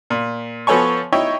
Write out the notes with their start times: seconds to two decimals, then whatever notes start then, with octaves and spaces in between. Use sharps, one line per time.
0.10 A#2
0.67 F3 B3 A4 C#5 G#5 C#6
1.12 D#4 E4 C#5 D#5 E5 G5